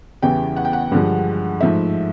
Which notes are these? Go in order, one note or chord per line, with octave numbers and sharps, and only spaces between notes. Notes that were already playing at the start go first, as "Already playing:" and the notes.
E2 C#3 E3 G3 B3 G5
F#5
G5
F#5
G2 D3 F3 G#3
G#2 F3 A3 E5